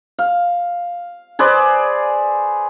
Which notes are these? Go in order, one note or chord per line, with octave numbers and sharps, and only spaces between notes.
F5
G#4 B4 C5 D5